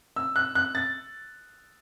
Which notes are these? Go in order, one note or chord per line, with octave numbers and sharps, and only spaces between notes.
E6
F#6
F#6
A6